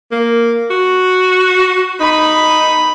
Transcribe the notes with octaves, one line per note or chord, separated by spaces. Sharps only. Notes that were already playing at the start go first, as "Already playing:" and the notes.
A#3
F#4
D#4 B5